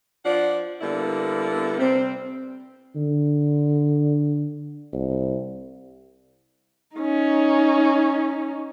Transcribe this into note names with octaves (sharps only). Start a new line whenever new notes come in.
F3 D4 F4 D5 F#5
D3 G3 A#3 B3 E4
C3 G3 C4
D3
C2
C#4 D#4